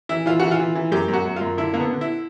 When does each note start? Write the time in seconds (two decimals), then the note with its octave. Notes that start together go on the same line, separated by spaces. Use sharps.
0.09 E3 E4
0.26 E3 F4
0.39 E3 F#4
0.51 F4
0.59 E3
0.75 E3
0.92 F#2 G4
1.08 F#2
1.13 F#4
1.25 F#2
1.36 F#2 F4
1.57 D3 E4
1.74 D3 A#3
1.79 B3
1.91 D3
2.01 E4